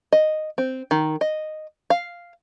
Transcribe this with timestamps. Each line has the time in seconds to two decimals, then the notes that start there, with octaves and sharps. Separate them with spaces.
0.12 D#5
0.58 C4
0.91 D#3
1.21 D#5
1.90 F5